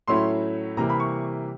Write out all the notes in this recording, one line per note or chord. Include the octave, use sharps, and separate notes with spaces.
A2 F#3 A3 C#4 E4 C6
C3 E3 G3 A#3 A#5
B5
C#6